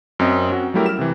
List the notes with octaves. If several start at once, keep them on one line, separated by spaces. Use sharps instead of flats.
F#2 C4 D#5
C#4 F#4
F#3 G3 A3 E4 G4 A#4
F6 E7
C3 E3